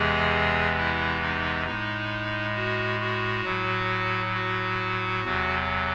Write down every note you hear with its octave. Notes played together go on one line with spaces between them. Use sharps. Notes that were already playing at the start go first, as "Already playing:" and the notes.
Already playing: E2 C3 E3 G#3 G#4
E4
D#4
A2 G#3 D#4
F#4
F#4
A2 F#3
F#4
E2 C3 F#3